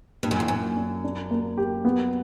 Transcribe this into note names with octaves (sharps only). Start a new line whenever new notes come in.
G2 A#2
F#2
E2
F#2 A#2
D4
D4
A#3
G4
B3